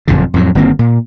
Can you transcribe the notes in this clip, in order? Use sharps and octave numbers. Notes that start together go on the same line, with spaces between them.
F#1 F2 A#2 D3
F2 A2 F#3
G1 D#3 A#3 C4
A#2